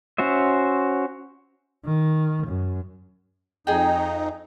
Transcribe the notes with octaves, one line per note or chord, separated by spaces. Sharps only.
C#4 F#4 C5 E5
D#3
F#2
F2 D#4 G#4 G5